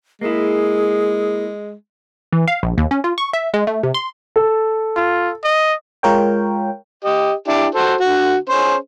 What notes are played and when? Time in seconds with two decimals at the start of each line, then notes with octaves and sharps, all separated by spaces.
0.21 G#3 A#3 E4 G#4
2.33 E3
2.48 F5
2.63 A#1
2.78 D#2
2.91 C#4
3.04 F4
3.18 C#6
3.33 E5
3.54 G#3
3.67 A3
3.83 C3
3.94 C6
4.36 A4
4.96 F4
5.44 D#5
6.03 G#3 F4 A#4 C#5 G5
7.04 G4 D#5
7.48 D4 E4 G4
7.75 F#4 A4 C5
8.00 D3 F#4
8.49 C#4 G#4 C5